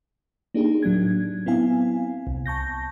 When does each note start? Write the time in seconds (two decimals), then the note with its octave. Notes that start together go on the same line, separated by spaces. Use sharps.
0.54 A#3 D4 D#4 G4 G#4
0.83 A2 F#3 D4 G#6
1.46 B3 C4 E4 F5 G#5
2.27 C2
2.46 A5 C#6 G6 A#6